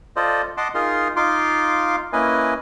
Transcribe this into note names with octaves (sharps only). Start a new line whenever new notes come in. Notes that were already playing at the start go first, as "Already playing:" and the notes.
F4 A4 C5 D5 D#5
D#5 F#5 A5 C6 D6
D#4 F4 G#4 A#4 C6
D#4 F4 F5 C6 D6
A#3 C#4 E4 B4 D#5 G#5